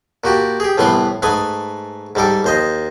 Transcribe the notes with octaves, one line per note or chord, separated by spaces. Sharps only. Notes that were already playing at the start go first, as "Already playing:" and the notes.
A#2 F#4 G4 A5
G4 G#4
C2 A2 E3 B3 B5 C6
G#2 A3 B4 G#5 D#6
G#2 G3 A4 D6
D#2 C5 D#5